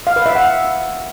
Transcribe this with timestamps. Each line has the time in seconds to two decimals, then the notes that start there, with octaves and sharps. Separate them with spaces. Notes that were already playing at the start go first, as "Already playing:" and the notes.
0.07 F5
0.16 B4
0.26 E5
0.35 F#5